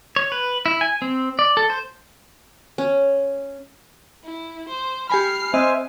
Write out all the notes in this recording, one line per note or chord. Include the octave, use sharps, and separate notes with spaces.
C#5
B4
E4
G#5
C4
D5
A4
C5
C#4
E4
C5
G4 G#5 B5 F6 C7
C4 C5 D#5 E5 G#5